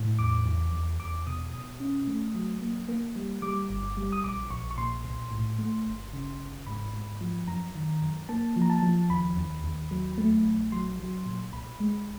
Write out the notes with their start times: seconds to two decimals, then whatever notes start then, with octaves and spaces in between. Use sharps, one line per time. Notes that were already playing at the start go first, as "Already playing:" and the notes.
Already playing: A2
0.19 E2 D6
0.46 E2
0.73 E2
1.00 E2 D6
1.27 B2 D#6
1.54 B2 D#6
1.80 C#4
2.07 A3
2.35 F#3
2.61 A#3
2.89 A#3
3.16 G3
3.42 G3 D6
3.70 G1
3.97 G3
4.12 D#6
4.24 A#1 D6
4.50 A#1 C#6
4.71 C#6
4.78 A#2 C6
5.05 B1
5.32 A2
5.59 A3
5.86 G1
6.13 C#3
6.40 G1
6.67 G#2 B5
6.94 G#2
7.21 F3
7.48 F#2 A#5
7.75 D#3
8.02 F#2
8.29 A#3 A5
8.56 F3
8.62 A#5
8.70 A5
8.83 F3
9.10 D#2 B5
9.37 D#2
9.64 D#2
9.91 F#3
10.18 A3
10.45 A#1
10.72 F#3 C6
10.99 F#3
11.26 A#2
11.53 B1 B5
11.80 G#3